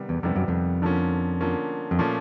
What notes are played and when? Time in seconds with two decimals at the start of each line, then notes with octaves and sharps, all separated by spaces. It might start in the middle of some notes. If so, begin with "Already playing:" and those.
Already playing: C3 D#3 G3 B3
0.09 E2
0.23 F2 C3 D#3 G3 B3
0.36 F#2
0.48 F2
0.82 D3 F3 A#3 C#4
1.41 D3 F3 A#3 C#4
1.91 F2
1.99 A#2 F3 A3 C#4